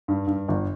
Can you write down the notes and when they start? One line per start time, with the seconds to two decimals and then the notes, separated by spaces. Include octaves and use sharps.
0.08 G2
0.27 G2
0.48 G1